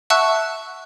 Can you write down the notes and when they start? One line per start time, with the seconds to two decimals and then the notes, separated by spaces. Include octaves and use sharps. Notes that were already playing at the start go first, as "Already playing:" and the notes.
0.10 E5 F#5 A5 C#6 E6 F#6